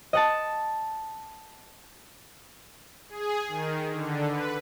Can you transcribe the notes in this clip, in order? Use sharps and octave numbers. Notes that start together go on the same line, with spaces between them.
D#5 F#5 A5
G#4
D#3
D3
B4